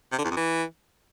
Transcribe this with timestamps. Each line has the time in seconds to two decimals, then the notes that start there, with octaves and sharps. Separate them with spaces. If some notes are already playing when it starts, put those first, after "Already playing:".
0.12 C3
0.18 D3
0.24 E2
0.31 F2
0.37 E3